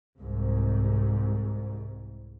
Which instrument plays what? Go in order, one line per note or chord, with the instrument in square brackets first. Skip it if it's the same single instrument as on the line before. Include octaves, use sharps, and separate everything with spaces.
[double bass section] C2 G#2